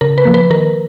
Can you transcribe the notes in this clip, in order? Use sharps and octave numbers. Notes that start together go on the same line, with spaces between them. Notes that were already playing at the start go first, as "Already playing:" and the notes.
C#3 A#4
B4
F3 A#3
B4
D#3 A#4